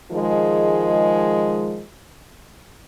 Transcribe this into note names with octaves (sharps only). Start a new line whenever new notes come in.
D#3 F3 G#3